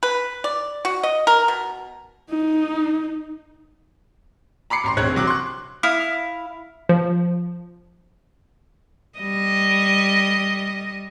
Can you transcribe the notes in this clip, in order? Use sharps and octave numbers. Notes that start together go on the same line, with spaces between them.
B4
D5
F#4
D#5
A#4
B2
D#4
A#5 B5 D6 C7 C#7
A1 A#5 C6
F1 A#1 C4 C#5 F#6
C2 F#3 D6 F#6
C6 C#6 F#6
E4 F5 D#6
F3
G3 D#5